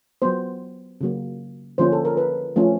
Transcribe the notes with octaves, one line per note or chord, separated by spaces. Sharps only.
F#3 B3 C5
C#3 F#3 A#3
D3 F3 A#3 C#4 C5
A4
A#4
B4
F3 A3 C#4